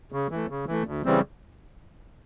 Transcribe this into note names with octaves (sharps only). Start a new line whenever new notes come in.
C#3
E3 A3
C#3
E3 A3
D2
C#3 E3 G3 C4